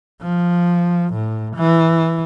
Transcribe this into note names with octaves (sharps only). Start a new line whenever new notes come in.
F3
A2
E3